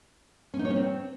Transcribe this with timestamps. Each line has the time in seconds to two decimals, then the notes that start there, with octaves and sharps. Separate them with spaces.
0.54 C#4
0.59 D#4
0.65 C#5
0.70 C#4
0.76 C4